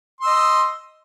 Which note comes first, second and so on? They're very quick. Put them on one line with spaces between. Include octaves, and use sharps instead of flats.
C6 E6 D#5